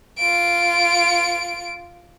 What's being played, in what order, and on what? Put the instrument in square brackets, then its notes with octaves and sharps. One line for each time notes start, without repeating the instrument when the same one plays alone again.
[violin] F4 D7